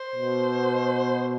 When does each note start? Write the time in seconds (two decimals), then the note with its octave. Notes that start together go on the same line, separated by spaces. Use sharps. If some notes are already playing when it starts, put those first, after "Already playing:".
Already playing: C5
0.16 B2